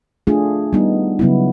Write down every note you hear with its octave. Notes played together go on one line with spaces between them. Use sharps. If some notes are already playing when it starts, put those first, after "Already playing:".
A3 D4 F4 G#4
G3 B3 D#4
C#3 F#3 B3 E4